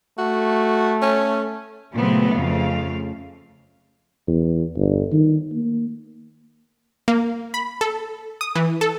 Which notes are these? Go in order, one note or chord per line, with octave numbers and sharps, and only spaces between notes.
A3 F#4
C#4
A#2 C#3 F#3 A3 B3 C4
F2 C#3 A3 F5
E2
G1
D#3
A#3
A#3
B5
A4
D#6
E3
A4